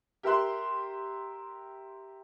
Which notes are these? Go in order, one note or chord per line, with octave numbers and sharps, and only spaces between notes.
G4 A#4 E5 C6 F#6